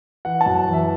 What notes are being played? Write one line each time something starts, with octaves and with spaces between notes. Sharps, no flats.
E3 F#5
A5
F#2
E3 E5